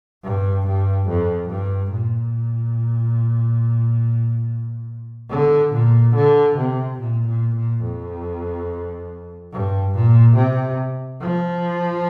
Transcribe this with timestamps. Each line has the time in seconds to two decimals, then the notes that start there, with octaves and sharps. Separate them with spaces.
0.24 G2
0.67 G2
1.09 F2
1.50 G2
1.92 A#2
5.30 D3
5.73 A#2
6.15 D3
6.57 C3
6.99 A#2
7.27 A#2
7.56 A#2
7.83 F2
9.53 G2
9.95 A#2
10.36 C3
11.21 F3